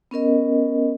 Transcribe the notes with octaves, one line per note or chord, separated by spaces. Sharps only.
B3 C#4 A#4 D#5